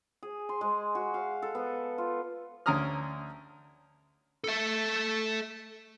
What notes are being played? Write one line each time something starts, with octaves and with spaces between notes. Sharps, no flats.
G#4
C6
G#3
F#4
F5
A4
B3
F4
D2 C#4 A#5 D#6 F6
A4 E5